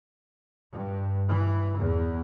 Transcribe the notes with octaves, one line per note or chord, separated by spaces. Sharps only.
G2
E3
E2